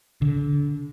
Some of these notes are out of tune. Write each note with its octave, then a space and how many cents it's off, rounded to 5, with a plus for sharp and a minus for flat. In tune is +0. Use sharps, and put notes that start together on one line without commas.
D3 -25